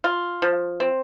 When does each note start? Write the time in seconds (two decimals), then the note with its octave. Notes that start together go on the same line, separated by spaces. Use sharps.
0.04 F4
0.42 F3
0.80 C4